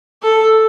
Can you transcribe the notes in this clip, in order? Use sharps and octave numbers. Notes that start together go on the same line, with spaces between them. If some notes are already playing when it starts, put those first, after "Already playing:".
A4